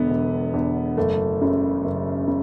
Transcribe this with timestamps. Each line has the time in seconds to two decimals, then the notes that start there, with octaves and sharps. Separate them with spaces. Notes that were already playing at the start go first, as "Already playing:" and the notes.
Already playing: E1 E2 D3 B3
0.10 E1
0.54 E2 D3
0.97 F#1 A3
1.41 F#2 C#3
1.84 F#1
2.28 C#3